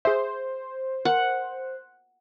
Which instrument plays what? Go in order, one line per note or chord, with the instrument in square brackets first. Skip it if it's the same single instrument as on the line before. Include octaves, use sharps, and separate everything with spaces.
[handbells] G#4 E5 [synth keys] C5
[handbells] A#4 [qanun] F#5